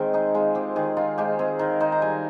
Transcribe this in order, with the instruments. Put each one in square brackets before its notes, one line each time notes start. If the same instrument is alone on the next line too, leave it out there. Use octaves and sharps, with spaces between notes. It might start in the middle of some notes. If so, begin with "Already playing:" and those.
Already playing: [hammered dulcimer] D#3 G#3 C4 A#4
D#4 G#4
G#3 F4
C4 G4
D#3 G#4
D#4 F4
G#3 G4
C4 G#4
D#3 A#4
D#4 C5
A#5
G3 G#5